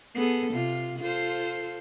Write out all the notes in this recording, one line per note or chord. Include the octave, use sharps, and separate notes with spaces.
B3 G#4 A4
C3 F4
F4 A4 C5